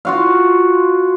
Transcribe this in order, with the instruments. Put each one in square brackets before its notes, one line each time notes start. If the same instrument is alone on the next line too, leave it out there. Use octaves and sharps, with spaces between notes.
[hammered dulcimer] F4 F#4 F5